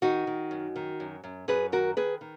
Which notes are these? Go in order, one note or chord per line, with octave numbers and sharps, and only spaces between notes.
D#3 D#4 F#4
D#3
F#2
D#3
F#2
F#2
F#2 G#4 B4
D#3 F#4 A#4
D#3 G#4 B4
D#3